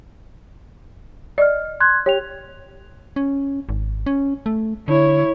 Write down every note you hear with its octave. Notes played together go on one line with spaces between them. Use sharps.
D5 D#5 F6
C6 F#6 G#6
G4 C#5 G5 F7
C#4
G#1
C#4
A3
D3 E4 C#5